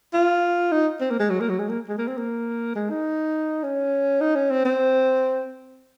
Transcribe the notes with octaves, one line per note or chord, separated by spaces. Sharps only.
F4
D#4
C4
A#3
G#3
F#3
A#3
F#3
G#3
A#3
G#3
A#3
C4
A#3
G#3
D#4
C#4
D#4
C#4
C4
C4